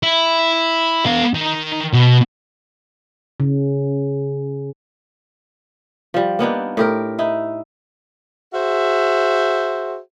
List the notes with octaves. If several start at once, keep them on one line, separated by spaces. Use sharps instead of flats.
E4
B3 F5
D#3
B2
C#3
F3 G3
A#3 B3 D4 D#4
A2 G4 A#4
D#4 E4
F#4 G#4 C5 E5